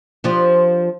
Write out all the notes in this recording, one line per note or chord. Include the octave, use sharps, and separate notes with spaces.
F3 D4 G4